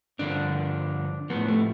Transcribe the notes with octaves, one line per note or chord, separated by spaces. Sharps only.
G2 D3 F3 D4
A2 F3 B3
A3